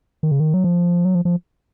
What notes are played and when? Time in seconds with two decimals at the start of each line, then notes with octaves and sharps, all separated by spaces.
0.23 D#3
0.31 C#3
0.40 D#3
0.54 F#3
0.64 F3
1.05 F#3
1.15 F3
1.25 F3